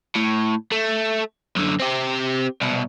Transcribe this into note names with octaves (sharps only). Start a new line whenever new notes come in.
A2
A3
F#2 D3
C4 G4
C2 B2